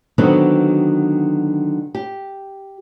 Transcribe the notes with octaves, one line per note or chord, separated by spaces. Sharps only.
D3 D#3 F#3 B3 C4 F#4
G4